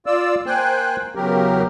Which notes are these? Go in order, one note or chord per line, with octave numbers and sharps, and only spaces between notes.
F4 D5 E6
A#3 C5 G5 G#5 F#6
E2 C#3 F#3 G4 A#4